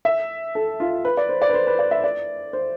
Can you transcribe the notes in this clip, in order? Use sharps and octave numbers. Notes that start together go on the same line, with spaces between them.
E5
A4
F4
B4
D5
C5
D5
B4
C5
B4
D5
E5
D5
C5